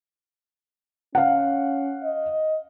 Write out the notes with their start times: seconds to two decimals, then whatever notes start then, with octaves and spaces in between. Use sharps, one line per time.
1.15 C#4 F5 F#5
2.03 D#5